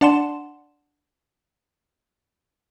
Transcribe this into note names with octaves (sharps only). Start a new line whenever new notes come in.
D4 D5 F#5 A5 C6 E7